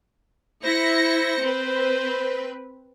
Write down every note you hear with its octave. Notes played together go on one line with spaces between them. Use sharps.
E4 C5 A#6 C#7
C4 B4